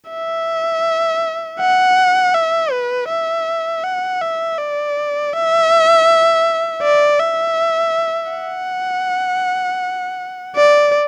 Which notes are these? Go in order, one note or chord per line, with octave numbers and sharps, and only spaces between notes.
E5
F#5
E5
B4
E5
F#5
E5
D5
E5
D5
E5
F#5
D5